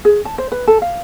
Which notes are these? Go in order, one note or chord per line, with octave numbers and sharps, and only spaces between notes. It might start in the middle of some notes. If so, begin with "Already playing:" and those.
G#4
A5
C5
B4
A4
F5